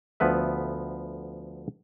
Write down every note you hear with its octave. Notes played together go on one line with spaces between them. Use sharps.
D2 F3 B3 B4 E5